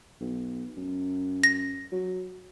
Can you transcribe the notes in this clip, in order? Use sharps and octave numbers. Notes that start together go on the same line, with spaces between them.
B1
F#2
A#6
F#3